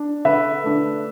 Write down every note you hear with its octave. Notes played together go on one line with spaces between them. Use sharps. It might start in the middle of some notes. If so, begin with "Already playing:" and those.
Already playing: D4
D3 B4 E5
A3 D4